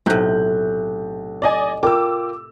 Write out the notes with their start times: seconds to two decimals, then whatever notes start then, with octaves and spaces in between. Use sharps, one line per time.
0.06 B1 A2 C3 F#6 G6
1.42 D5 D#5 G#5
1.83 F4 A#4 G5 D6 E6